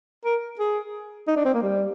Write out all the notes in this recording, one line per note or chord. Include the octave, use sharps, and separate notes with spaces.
A#4
G#4
D#4
D4
C4
A#3
G3